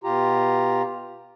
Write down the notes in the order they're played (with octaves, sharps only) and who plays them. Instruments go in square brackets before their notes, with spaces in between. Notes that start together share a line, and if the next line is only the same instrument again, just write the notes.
[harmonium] B2 F4 G4 A#5